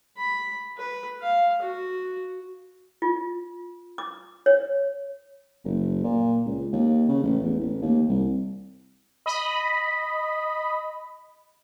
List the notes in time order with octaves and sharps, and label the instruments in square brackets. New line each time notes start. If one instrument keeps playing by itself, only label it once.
[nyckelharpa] B5
B4
F5
F#4
[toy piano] F4
D6
C#5
[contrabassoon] F#1
A#2
C#2
D#2
C#3
A1
E2
A1
D#2
C2
[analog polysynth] D#5 B5